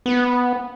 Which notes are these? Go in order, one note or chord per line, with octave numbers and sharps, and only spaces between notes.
B3